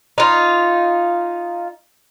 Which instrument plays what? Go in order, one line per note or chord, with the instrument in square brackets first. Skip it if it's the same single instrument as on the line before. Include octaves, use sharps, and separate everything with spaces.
[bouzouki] D#4 F4